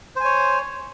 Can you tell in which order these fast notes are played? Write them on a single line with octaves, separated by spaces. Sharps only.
C5 G#5 C#5